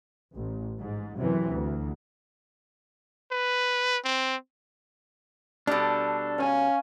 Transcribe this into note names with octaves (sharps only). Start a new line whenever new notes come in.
A1
G#2
F#2 C3 E3
D2
B4
C4
B2 G3 D4 A4
C#4 F5 G#5